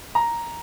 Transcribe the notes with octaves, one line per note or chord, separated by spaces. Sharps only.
A#5